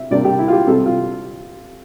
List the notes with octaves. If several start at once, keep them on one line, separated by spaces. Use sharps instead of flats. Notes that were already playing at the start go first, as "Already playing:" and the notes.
Already playing: C3 E5
C3 G3 A#3 D4 D5
G4
E4
F4
G4
C3 G3 C4 A4
F4